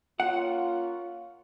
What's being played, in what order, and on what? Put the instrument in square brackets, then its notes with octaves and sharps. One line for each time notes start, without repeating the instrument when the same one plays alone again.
[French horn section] A#3 C#4 F4 [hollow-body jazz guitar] F#5